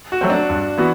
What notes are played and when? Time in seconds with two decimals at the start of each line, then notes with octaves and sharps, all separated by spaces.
0.12 F#4
0.21 F#3 A3 C4
0.30 D4
0.49 G2
0.78 E3 B3 F#4